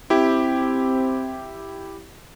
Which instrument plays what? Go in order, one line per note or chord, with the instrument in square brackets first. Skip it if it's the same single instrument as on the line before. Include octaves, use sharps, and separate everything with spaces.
[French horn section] C4 [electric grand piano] E4 G4